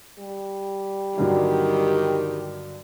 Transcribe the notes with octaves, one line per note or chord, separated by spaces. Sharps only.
G3
G2 D3 D#3 F#3 G4